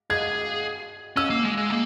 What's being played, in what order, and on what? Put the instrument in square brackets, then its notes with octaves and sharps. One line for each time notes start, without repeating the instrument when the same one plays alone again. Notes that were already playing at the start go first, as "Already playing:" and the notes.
[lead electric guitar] G#4 [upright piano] G#6
[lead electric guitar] C#4 [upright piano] E6
[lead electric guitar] A#3
G#3
G#3
A#3